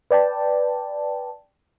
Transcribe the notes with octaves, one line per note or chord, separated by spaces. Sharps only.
B4 D5 G5 A5